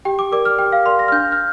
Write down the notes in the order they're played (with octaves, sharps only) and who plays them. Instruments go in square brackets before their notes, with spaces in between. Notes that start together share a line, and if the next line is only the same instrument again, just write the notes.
[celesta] G4 G5
D6
A#4 D5 D6
F6
G4 G5
F5
A#4 D5 C6
A#6
F6
D4 G6
F6